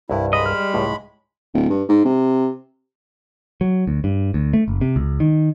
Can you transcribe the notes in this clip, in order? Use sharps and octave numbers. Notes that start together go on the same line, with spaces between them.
C2 G2 E4
G#3 D#5 B5
G3 F6
C#2 A2
D1
G2
G#2
C3
F#3
D2
G2
D2
A3
F#1
C3
C#2
D#3